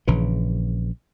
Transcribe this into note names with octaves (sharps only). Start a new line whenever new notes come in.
A#1 C#3 E3